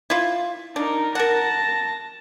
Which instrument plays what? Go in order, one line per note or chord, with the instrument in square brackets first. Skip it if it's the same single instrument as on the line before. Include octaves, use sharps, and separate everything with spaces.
[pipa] E4 F4
[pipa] D4 [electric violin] D#4 A#4
[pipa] A#4 F#5 [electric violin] A5 A#6